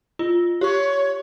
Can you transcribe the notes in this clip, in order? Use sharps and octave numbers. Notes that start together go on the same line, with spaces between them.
F4
G4 C#5 C#6